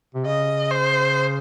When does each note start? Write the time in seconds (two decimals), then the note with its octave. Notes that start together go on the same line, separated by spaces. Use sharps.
0.15 C3
0.25 C#3 D#5
0.71 C5